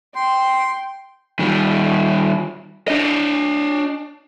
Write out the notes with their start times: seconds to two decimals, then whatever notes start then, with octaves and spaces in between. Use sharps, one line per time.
0.15 G5 C6
1.39 D#3 G3
2.88 D4 D#5